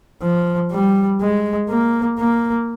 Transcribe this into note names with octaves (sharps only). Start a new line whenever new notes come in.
F3
G3
G#3
A#3
A#3